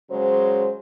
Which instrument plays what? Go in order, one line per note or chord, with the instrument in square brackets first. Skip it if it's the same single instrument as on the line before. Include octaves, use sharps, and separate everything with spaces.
[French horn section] C#3 F#3 G#3 C5